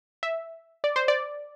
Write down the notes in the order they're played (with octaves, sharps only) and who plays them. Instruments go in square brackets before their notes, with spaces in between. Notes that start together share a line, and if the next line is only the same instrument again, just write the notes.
[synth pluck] E5
D5
C5
D5